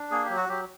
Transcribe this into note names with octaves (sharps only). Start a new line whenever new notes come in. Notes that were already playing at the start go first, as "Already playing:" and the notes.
Already playing: D4
A#3 G#4
G4
F#3
F#4
F#3 G4